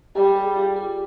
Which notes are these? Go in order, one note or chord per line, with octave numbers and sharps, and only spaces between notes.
G3 G4
G#4
F4
G4